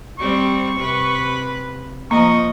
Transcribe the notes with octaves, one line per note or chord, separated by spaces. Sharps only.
G3 C4 C#6
C3 B4
F3 A#3 D#5 C#6